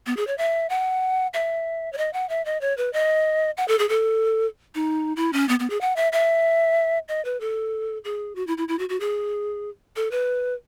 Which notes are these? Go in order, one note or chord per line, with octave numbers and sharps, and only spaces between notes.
B3
G#4
C#5
E5
F#5
E5
C#5
D#5
F#5
E5
D#5
C#5
B4
D#5
F#5
A4
G#4
A4
D#4
E4
C#4
B3
B3
G#4
F#5
E5
E5
D#5
B4
A4
G#4
F#4
E4
E4
E4
F#4
F#4
G#4
A4
B4